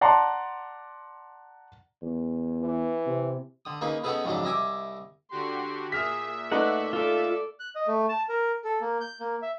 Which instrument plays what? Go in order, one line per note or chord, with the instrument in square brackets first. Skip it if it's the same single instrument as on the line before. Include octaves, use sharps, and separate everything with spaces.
[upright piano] D5 F#5 A5 A#5 C6
[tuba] E2
[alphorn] E3
[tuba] C3
[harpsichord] D3 D#6
A#3 C#4 D#4 G#4 B4
B3 C#4 D#4 G#4 A4 B4
F2 G#2 C#3 F#3 D4
C2 D#5 E5 G#5 D6
[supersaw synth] D3 F#4 G4 [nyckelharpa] C6
[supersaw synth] A#2 E5 [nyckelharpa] G#4 [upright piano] F6 B6
[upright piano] A3 D#4 B4 [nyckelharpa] D5 [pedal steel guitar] F#5
[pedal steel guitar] F4 [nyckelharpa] A4 D5
[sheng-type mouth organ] F#6
D#5
A3
A5
A#4
A4
A#3
G6
A#3
E5